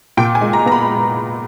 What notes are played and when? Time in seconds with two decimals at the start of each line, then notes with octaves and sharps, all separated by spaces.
0.17 A#2 G5
0.35 G#5
0.41 G#3
0.53 A#5
0.66 B3 A#5
0.72 B5